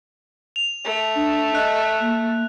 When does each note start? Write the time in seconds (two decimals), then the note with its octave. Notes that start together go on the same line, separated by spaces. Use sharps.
0.56 F7
0.85 A3
1.16 D4
1.55 D#5 F#6
2.00 A#3